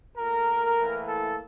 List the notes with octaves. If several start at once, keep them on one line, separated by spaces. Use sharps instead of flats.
A#2 A3 A#4
A2 E3 A#3
A4